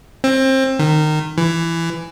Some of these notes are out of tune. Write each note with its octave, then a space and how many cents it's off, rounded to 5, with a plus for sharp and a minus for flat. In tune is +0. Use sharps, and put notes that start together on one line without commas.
C4 +25
D#3 -20
E3 +15